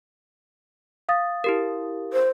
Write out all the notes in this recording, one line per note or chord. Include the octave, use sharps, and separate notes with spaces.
F5 D#6 A6
E4 G4 A#4
C5